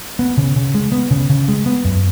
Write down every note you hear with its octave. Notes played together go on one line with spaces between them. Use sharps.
B3
C#3
C#3
G#3
B3
C#3
C#3
G#3
B3
F#2